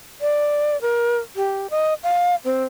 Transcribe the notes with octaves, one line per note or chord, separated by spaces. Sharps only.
D5
A#4
G4
D#5
F5
C4